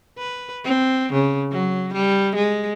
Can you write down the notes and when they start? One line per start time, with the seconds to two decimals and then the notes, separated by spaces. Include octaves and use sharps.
0.18 B4
0.65 C4
1.13 C#3
1.52 F#3
1.93 G3
2.36 G#3